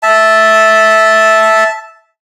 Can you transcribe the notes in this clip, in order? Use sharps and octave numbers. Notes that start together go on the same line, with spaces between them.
E5 A5